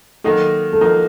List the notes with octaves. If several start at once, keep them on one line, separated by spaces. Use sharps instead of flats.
D#3 F#3 A#3 D#4 F#4 A4
A4
F3 A#3 D#4 F#4 A#4